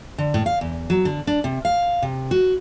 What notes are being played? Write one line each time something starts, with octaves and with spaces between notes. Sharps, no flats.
D3
A2
F5
E2
F#3
D3
D4
C3
F5
C3
F#4